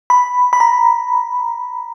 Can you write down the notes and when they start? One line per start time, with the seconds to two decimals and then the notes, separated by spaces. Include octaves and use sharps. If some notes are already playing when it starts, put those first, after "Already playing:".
0.10 B5
0.53 B5
0.60 A#5